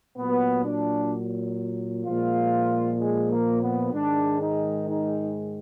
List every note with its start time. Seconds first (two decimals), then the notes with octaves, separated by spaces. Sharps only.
0.17 A#2 F#3 B3
0.64 D4
2.05 A#2 F3 G#3 F4
2.99 G#3
3.30 A#3
3.62 B3
3.93 G#2 D#3 G#3 D4
4.40 D#4
4.87 D#4